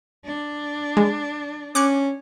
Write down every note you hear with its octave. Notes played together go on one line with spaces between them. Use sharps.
D4
G#3
C#4 D6 F#6 C#7